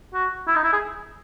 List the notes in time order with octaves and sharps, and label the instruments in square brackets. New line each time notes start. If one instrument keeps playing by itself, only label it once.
[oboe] F#4
E4
D#4
E4
G#4